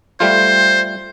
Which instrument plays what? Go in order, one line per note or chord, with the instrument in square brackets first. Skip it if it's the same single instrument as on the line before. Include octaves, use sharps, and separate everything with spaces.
[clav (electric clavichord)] G3 A3 F4 [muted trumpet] C5